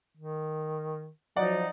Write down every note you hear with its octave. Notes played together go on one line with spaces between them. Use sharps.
D#3
F3 F#3 D#4 D5 F#5